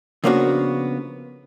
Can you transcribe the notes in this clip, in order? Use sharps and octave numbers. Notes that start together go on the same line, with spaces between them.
C#3 F3 A#3 B3 D4 F#4